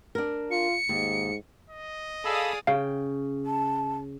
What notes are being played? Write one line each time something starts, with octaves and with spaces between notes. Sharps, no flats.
D4 A#4
F4 C#7
D#2 G#2
D#5
G#4 A4 D5 F5 B5 D#6 E6
C#3 F5 G5
A5